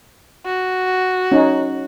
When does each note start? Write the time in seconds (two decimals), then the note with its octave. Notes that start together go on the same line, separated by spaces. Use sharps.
0.46 F#4
1.32 C#4 D#4